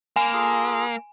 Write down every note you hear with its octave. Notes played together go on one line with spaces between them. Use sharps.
A#3 G#5
F4 G#4 A4